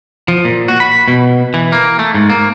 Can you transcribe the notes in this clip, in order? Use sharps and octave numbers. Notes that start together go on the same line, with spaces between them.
F3
A#2
F#4
B5
B2
E3
A#3
A3
G#2
A#3